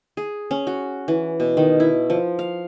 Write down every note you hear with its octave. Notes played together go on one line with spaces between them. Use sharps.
G#4
C#4
F#4
E3
B2
D#3
E4
F3
F5